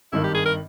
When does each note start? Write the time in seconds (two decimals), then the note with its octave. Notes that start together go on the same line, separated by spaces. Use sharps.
0.12 G#1 G2 D#3 E4
0.24 G4
0.35 G#4
0.46 A#4